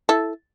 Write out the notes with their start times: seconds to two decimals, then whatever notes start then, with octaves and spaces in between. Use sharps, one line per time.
0.09 E4 A4